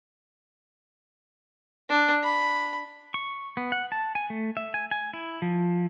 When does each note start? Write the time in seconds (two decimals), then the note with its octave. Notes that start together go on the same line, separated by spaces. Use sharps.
1.90 D4
2.24 B5
3.14 C#6
3.57 B3
3.72 F#5
3.92 A5
4.15 G#5
4.30 A3
4.57 E5
4.74 G#5
4.91 G#5
5.14 E4
5.42 F3